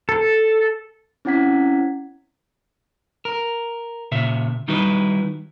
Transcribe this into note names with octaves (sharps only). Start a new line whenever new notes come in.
A4
C4 C#4 E4 F#5 G#6 B6
A#4
A#2 C#3 E5
D#3 G3 D#4 E4 F#4 B4